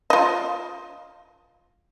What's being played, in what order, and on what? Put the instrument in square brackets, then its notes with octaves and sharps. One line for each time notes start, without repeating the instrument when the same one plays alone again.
[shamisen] F4 D#5